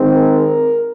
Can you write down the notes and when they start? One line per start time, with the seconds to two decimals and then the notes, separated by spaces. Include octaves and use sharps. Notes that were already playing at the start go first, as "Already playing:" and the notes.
Already playing: D#3 G#3 C4
0.14 A#4